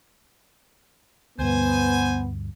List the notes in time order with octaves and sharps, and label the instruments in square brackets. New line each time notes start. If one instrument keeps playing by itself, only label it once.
[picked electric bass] D2 G2 [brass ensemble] B3 [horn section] C5 G#5